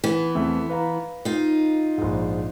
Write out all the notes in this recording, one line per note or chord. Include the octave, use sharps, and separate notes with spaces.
E3 B3
E2 A3 C4
B4 F5 A#5
D#4 F4
A#1 G#2